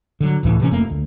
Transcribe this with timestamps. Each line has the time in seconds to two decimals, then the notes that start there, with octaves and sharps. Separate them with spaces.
0.20 D3 F#3
0.43 F1 C#2 A2 E3
0.60 C3 E3 G#3 C#4
0.71 F1 F2 A3 A#3
0.90 D2